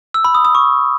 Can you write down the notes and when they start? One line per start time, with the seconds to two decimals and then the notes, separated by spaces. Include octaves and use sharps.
0.14 E6
0.24 B5
0.35 D#6
0.45 D#6
0.55 C#6